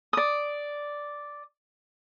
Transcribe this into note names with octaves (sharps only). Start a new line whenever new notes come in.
D5 D#6